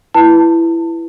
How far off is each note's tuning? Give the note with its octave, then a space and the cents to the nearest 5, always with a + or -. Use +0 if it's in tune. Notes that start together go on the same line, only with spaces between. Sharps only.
E4 +15 B4 +0 A5 +30